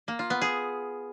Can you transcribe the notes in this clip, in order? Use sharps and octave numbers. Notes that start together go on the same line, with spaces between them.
A#3
F4
B3
G#4